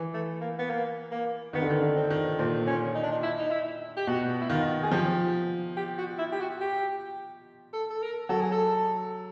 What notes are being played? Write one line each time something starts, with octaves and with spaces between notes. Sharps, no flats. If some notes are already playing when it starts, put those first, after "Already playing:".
Already playing: E3
A3
A#3
B3
A#3
A#3
D#3 B3
D3
D#3
D3
C4
D#3
A#2 C4
C#4
D#4
D4
D#4
E4
D#4
E4
G4
B2 F#4
E4
D#3 F4
G#4
F3 G4
G4
F#4
E4
G4
F#4
G4
A4
A4
A#4
F#3 A4
G#4
A4